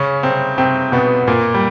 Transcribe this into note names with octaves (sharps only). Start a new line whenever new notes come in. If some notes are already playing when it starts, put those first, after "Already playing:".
Already playing: C#3 C#4
C3 C4
C3 C4
B2 B3
A#2 A#3
G3